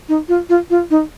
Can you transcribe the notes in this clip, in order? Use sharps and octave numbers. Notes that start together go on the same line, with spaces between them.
D#4
F4
F4
F4
D#4